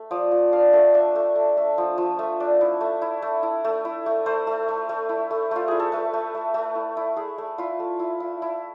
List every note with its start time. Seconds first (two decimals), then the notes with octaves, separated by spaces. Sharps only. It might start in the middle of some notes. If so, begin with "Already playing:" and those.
Already playing: A3
0.11 F3 D5
0.32 F3
0.53 D4 F5
0.73 A3
0.94 D4 E5
1.15 A3
1.35 A3
1.57 A3
1.78 F3
1.98 F3
2.19 A3
2.40 D4
2.61 E4
2.81 A3
3.02 E4
3.22 A3
3.43 E4
3.65 A3
3.85 E4
4.06 A3
4.26 A3 C5
4.47 A3
4.68 A3
4.89 A3
5.09 E4
5.31 A3
5.51 A3 F4
5.68 E4 G#4
5.80 A4
5.92 A3 B4
6.13 A3
6.35 A3
6.54 A3
6.75 E4
6.97 E4
7.16 E4 G#4
7.38 A3
7.58 E4 F4
7.80 A3
8.00 E4
8.20 E4
8.42 E4